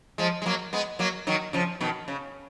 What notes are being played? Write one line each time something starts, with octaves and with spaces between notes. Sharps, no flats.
F3 G#3
G#3
F#3 A#3
G#3 B3
F#3 A#3
D#3 F#3
C#3 F3
B2 D#3
C#3